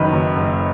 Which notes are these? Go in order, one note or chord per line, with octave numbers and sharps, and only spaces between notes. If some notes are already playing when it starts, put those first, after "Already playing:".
Already playing: F#1 F#2 D#3 F#3 B4
F#2
F#1